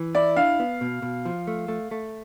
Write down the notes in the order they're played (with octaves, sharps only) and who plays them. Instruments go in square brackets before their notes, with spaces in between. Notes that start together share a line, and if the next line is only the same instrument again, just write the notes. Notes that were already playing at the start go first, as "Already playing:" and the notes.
Already playing: [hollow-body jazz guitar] E3
[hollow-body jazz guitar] E4 [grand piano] D5
[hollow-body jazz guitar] D4 [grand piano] F5
[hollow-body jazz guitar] B3
B2
B2
F3
A3
A3
A3